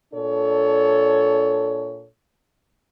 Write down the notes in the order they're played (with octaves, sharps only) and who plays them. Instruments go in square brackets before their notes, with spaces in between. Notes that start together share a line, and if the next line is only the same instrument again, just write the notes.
[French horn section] A#2 D4 A4 C#5